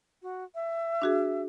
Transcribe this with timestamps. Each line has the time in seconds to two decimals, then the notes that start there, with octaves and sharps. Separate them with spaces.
0.22 F#4
0.55 E5
1.02 D4 F#4 G#4